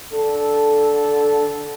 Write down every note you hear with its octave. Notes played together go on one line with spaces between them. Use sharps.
D3 A4